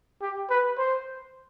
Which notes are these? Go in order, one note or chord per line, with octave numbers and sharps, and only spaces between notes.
G4
B4
C5